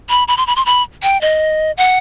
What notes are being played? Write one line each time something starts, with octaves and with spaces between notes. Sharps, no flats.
B5
B5
C6
B5
C6
B5
G5
D#5
F#5